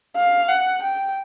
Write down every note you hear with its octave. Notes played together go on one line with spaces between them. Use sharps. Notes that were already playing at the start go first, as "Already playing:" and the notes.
F5
F#5
G5